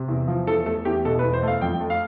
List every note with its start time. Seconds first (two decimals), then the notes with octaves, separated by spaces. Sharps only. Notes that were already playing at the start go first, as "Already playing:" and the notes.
Already playing: C3
0.08 E2
0.28 F3
0.47 E2 A4
0.66 A3 A4
0.85 E2 G4
1.05 B2 A4
1.19 B4
1.23 E2
1.33 C5
1.43 A3 F5
1.61 F2 G5
1.81 A3
1.90 F5